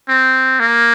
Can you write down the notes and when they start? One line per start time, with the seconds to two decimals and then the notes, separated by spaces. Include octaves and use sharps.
0.09 C4
0.60 A#3